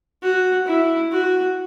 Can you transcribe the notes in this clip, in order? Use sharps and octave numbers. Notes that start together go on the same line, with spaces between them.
F#4
E4
F#4